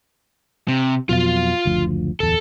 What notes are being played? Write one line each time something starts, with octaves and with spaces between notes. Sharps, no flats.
C3
F2 B2 F#3 F4 F5
F#1 D2 F3
D1 E2 A4